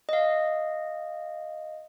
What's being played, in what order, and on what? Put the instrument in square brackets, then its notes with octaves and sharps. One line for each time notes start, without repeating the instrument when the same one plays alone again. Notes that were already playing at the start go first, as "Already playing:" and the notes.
[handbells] D#5 F5